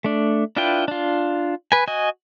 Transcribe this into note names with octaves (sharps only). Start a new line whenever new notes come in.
A3 D4
D4 E4 F4 B4 G5
D4 F4
B4 G#5
F#4 D#5 G#5